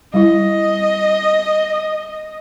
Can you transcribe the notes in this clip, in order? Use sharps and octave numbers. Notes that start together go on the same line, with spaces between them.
G3 E4 D#5